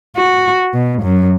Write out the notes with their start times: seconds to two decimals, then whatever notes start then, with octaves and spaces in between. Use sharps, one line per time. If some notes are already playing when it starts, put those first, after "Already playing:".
0.16 F#4
0.74 B2
1.02 F#2